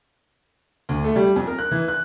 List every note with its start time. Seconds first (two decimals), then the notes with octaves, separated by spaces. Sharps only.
0.89 D2
1.04 A3
1.16 G3
1.36 F2
1.47 A#4
1.58 F#6
1.71 E3
1.88 F#6